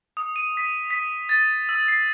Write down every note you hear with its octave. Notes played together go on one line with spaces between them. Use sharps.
D#6
D#7
B6
B6
A6
E6
C7